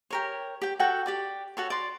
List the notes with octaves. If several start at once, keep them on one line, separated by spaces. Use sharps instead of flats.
G4 A#4 C#5
G4 G5
F#4 A4 F#5 G5
G4 D5 D6
F#4 A4 C#5
D5 C6